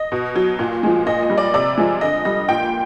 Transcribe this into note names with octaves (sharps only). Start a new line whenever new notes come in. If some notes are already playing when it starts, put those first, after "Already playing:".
Already playing: D#5
B2
F#3
A#2
F3 G#3
A#2 D#5
D#5
G3
D5
C3 D5
F3 G#3
D3 D#5
G3 D#5
A#2 G5